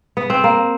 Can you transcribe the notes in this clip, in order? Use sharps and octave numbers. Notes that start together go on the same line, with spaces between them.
B3
C4
A#3